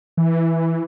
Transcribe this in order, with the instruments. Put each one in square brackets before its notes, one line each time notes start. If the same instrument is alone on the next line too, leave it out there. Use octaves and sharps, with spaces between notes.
[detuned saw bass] E3